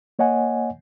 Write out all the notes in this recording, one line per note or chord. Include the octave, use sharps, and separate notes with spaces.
A#3 C#5 D#5 F#5 G#5